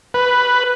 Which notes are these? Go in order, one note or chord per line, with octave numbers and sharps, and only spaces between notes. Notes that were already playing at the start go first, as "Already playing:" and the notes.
B4